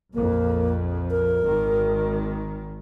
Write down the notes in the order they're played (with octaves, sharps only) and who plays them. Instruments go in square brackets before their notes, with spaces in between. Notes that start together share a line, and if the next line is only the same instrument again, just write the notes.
[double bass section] A#1 F2 [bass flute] A#3
[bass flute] A#4
[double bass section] G#1 D#3